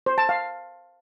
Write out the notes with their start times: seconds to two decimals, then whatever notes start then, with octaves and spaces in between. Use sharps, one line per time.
0.06 C5
0.18 A5
0.29 F5